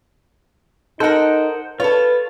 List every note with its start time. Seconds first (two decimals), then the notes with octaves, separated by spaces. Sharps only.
1.00 D#4 A4 A#4 C5 F#5
1.80 F4 A4 B4 C#5